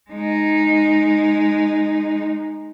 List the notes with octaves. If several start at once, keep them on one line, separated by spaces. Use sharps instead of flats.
G#3 D#4